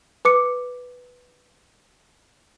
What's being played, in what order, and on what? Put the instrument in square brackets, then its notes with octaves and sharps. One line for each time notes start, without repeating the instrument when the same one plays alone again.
[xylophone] B4 D6 C#7